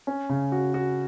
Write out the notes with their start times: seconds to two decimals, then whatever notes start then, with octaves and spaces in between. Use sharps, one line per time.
0.07 C#4
0.29 C#3
0.52 F#4
0.74 F#4